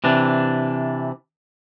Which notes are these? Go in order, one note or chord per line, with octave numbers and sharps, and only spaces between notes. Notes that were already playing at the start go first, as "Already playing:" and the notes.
C3 E3 D4